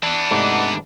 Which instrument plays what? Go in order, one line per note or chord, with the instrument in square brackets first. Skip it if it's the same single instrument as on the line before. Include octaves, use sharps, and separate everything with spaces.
[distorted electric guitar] E3 B3 [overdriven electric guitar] D4
[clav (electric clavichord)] G#2 C3 A3 [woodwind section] D#5 F#5 D6